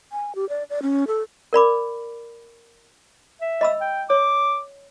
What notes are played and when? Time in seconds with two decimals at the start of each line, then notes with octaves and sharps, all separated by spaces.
0.12 G#5
0.35 G4
0.49 D5
0.70 D5
0.82 C#4
1.07 A4
1.53 A#4 D5 B5 D6
3.42 E5
3.61 D#5 B5 E6
3.81 G5
4.10 C#5 D6